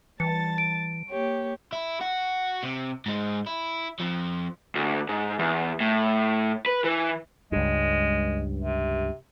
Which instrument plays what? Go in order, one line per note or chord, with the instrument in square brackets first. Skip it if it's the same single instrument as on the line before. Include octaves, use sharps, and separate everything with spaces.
[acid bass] E3 [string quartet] G3 A5 A6 [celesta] C#7
[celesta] D7
[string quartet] A#3 G4 C#5
[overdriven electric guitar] E4
F#4
C3
G#2 G#3
E4
F2 F3
D2
G#2
E2
A2
B4
E3
[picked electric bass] C#2 G2 [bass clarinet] G#3
[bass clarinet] C3